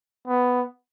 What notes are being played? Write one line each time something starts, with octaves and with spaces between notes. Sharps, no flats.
B3